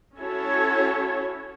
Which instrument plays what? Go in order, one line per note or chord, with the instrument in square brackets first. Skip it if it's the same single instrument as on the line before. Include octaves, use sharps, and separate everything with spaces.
[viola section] C#4 E4 F#4 A4 C#5